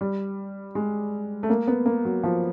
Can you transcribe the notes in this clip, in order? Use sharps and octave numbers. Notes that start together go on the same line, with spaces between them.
G3
G#3
A3
A#3
B3
A#3
F#3
F3